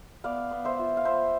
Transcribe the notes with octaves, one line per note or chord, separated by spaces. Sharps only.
B3 D5 F5
B3
C5 E5
F4
F5
B3 C5 E5